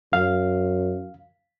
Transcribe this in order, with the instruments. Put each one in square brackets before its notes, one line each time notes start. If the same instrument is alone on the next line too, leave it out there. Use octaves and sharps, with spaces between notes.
[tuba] F#2 [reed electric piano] F5